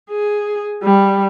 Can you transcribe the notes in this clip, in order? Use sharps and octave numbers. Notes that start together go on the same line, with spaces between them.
G#4
G3